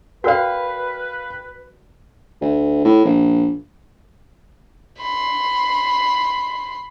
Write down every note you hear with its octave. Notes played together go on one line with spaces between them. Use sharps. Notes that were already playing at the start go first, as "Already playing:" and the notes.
F#4 A#4 B4 D5 F5 G5
D2
A2
A#1
B5 C6